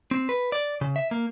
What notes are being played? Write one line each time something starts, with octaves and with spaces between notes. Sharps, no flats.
C4
B4
D5
C#3
E5
A#3